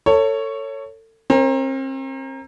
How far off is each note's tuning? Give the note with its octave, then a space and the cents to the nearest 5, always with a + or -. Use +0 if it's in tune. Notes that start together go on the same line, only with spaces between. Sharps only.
A4 +30 C#5 +0
C4 +40 A#4 +0